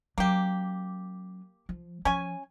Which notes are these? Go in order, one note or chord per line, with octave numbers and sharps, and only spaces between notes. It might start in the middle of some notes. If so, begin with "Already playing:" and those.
F#3 A#3 C#4 G4
F3
F3 C#4 G#5